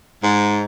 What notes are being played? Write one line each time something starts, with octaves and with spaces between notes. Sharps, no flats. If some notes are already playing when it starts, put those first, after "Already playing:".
G#2